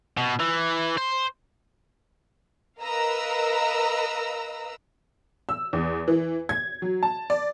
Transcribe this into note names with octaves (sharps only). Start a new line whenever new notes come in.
B2
E3
C5
A#4 B4 D#5 F5 A#5 E6
E6
E2
E3
G#6
F#3
A5
D5